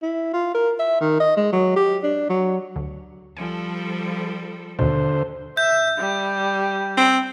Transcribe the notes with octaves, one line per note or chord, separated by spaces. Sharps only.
E4
F4
A#4
E5
D#3
D#5
G#3
F#3
G4
D4
F#3
D2
F3 G3 A4 G#5
D#2 B2 D3 C5
E5 G6
G3
C4